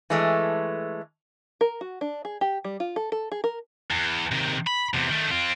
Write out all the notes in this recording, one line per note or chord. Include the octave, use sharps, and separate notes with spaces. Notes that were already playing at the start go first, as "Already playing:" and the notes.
E3 G#3 A3
A#4
F#4
D4
G#4
G4
G3
F4
A4
A4
G#4
A#4
E2
C3 D#3
B5
E2 C3
D#3 A3
C4 F4